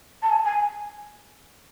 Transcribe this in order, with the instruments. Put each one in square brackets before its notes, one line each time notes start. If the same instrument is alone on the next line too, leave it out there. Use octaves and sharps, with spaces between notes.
[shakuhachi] A5
G#5
G#5